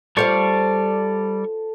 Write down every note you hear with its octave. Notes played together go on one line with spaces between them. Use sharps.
G3 F4 A4 C5 D5 F5 C#6